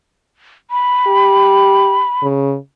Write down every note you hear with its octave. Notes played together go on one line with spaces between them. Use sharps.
B5
G4
C#3